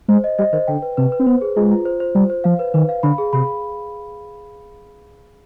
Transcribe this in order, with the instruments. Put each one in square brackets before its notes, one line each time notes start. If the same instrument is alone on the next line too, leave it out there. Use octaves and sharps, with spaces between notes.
[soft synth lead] G#3 [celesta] C5
[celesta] D#5
[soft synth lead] G3 [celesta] D#5
[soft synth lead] D#3 [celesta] C5
[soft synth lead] D3 [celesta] G5
[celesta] B4
[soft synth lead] C3 [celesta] B4
[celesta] B4
[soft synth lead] C4
[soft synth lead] B3 [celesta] C5
[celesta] G#4
[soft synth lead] G#3 [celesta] F4
[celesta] F4
C5
C5
[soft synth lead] G3 [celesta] C5
[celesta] C5
[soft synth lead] F3 [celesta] F5
[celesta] B4
[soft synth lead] D#3 [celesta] B4
[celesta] F5
[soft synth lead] D3 [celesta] B5
[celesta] G#4
[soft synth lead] C3 [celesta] B5